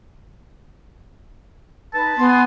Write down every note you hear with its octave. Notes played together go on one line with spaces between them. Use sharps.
D#4 B4 A5
B3 G#5 C6